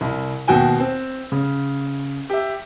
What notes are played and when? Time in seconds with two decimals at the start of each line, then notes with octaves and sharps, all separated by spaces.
0.01 C2
0.48 D#2 B2 F#4 G5 G#5
0.80 C4
1.32 C#3
2.30 G4 E5